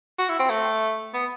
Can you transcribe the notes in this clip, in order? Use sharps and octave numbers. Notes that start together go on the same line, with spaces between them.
F#4
E4
C4
A3
B3